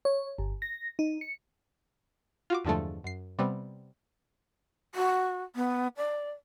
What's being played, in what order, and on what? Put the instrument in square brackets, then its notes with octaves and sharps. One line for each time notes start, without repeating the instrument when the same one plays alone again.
[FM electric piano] C#5
G1
A#6
D#4
C#7
[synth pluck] F4 F#4 D6
E2 G2 D3 F3 G#3 A3
F#2 C7
C3 G3 B3 C4
[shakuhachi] F#4
B3
D5